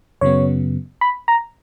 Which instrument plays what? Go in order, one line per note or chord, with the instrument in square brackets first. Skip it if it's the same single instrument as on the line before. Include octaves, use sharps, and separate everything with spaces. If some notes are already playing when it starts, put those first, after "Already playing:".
[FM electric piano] F#2 C#3 F#3 B3 C#5
B5
A#5